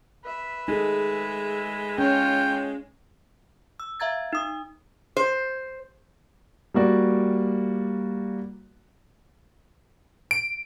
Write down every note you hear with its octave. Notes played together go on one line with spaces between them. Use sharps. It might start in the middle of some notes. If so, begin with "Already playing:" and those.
B4 E5
G#3 D#4 G#4 A4
C#4 F4 C#5 G5
E6
E5 F5 A#5 G#6 A6
D#4 D#6
C5
G3 A#3 F#4 D5
D7